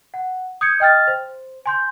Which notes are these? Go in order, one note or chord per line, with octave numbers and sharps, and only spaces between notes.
F#5
D#6 G6 G#6 C#7
D#5 G5 F6 A6
C5
G#5 C6 G6